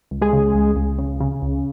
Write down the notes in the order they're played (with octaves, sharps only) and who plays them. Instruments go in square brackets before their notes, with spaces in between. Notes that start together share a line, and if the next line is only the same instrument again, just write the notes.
[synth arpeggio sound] C#2
G#3 G#4
C#3
C#2
C#2
C#3
C#3
C#2